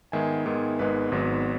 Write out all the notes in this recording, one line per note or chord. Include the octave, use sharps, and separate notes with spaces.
G#2 D#3 G#3 B3 E5 G#5
G#2 D#3 G#3 B3
G#1 G#2 D#3 G#3 B3 B4
G#1 G#2 F#3 B3